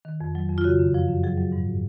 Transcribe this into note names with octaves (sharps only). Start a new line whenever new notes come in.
D#3
F2
F#3
F2
F4
C#3 F#4
F#2
F3
F#2
F#3 G#4
F#3
G#2